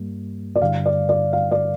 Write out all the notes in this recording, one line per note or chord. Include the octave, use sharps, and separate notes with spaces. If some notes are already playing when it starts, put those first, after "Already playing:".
Already playing: G2 G3 A#3
D5
G2 D3 G3 F5
D5
D5
F5
D5